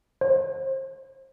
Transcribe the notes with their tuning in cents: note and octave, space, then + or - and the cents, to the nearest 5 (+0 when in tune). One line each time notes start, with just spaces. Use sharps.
C5 +35